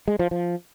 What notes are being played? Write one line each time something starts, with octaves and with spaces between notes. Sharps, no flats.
G#3
F3
F3